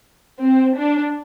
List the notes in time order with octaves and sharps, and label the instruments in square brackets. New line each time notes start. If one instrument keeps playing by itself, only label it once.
[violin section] C4
D4